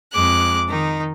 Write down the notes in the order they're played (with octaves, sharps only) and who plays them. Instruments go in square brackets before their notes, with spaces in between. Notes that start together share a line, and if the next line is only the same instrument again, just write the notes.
[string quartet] F2 G#3 D6 F#6
D#3 D#4